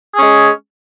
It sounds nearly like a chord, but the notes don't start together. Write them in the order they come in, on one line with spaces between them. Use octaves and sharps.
G#4 C#4 G#3